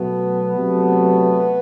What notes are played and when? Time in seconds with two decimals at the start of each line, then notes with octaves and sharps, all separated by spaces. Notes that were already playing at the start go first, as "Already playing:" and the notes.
Already playing: B2 F#3 A3 B3
0.57 C3 F#3 A3